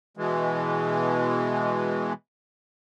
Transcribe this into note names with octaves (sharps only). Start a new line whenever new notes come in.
B2 E3 G#3